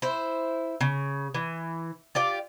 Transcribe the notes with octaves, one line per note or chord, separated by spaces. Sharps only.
E4 C5
C#3
E3
F4 G4 D5